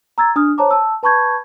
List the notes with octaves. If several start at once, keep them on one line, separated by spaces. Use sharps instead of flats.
A#5 E6 G#6 A6
D4 D#6 F6
C5 C#5 A5 A#5 D6
A5 E6
B4 A5 B5 C#6 G6 G#6